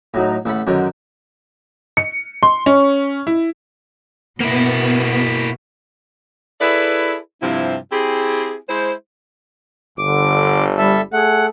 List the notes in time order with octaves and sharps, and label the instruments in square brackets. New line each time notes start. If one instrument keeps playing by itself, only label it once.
[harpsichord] A2 F#3 D#4
A1 A4 F#5 B5
F#2 D3 D#3 F#3
[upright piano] C#7
C6
C#4
E4
[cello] B2 [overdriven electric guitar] A#3 E4 [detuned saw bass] B3
[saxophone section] E4 G#4 A4 B4 D5 E5
G2 C3 F3 C4 E4
C4 E4 G4 G#4
G#3 E4 G#4 C5
[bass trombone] G1 [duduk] D3 [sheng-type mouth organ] D6
[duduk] G3 [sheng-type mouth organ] A4 E5
[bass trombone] A3 [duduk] G#4 [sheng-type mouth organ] F#5